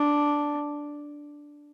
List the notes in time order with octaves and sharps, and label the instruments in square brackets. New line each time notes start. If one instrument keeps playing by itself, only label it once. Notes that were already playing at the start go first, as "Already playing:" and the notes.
Already playing: [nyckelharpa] D4